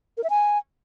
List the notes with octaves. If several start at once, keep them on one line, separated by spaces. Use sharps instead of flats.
A#4
E5
G#5